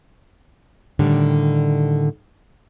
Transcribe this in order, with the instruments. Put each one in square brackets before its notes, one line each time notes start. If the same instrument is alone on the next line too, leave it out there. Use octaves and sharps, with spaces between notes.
[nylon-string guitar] A2 D3 D#3 G3